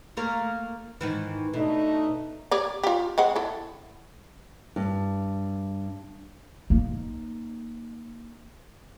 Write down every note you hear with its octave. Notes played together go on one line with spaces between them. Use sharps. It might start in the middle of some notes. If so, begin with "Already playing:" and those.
A3 A#3 A#4
G#2 D#3 E3
B2 A3 D4 D#4
G4 C#5 D5
F4 G4
G#3 C4 F#5
E4 A4
G2
A#3 D#4